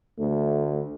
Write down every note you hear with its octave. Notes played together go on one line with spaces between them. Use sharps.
D2 A3